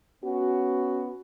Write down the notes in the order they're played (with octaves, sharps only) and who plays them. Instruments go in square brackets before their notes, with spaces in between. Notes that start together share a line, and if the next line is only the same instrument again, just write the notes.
[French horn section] B3 C#4 F#4